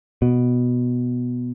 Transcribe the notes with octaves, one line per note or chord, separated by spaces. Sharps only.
B2